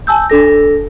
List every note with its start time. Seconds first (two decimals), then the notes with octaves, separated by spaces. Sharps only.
0.07 G#5 A5 E6 G6
0.30 D4 A4 A#6